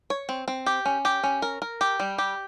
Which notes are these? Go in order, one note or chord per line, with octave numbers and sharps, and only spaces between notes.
C#5
C4
C4
G4
C#4
G4
C#4
A#4
A#4
G4
G3
G4